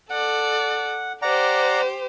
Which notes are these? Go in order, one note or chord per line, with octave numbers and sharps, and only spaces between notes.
A4 D5 F#5
G4 C5 D5 F#5 A#5